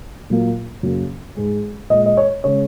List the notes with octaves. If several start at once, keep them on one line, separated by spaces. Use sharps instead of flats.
A#2 F#3 A#3
F#2 C#3 F#3 A#3
G#2 G#3
A#2 G#3 D#5
D#5
C#5
C#3 G#3 C#5